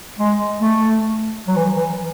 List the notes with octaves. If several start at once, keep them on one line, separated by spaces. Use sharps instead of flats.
G#3
A3
F#3
E3
F#3
E3